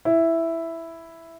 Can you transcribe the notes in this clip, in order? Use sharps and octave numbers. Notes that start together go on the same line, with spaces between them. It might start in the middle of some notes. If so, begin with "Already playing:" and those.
E4